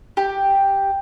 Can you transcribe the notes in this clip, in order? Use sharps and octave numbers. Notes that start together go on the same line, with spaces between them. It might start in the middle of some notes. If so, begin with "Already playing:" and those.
G4